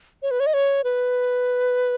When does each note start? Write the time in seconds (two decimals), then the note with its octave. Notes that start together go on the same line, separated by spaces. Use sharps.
0.22 C#5
0.31 B4
0.40 C#5
0.46 D#5
0.54 C#5
0.84 B4